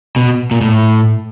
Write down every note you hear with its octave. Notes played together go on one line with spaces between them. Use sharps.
B2
A#2
A2